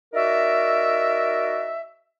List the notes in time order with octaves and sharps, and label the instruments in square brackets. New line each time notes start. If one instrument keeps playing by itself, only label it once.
[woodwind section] D#4 F#4 A#4 D5 E5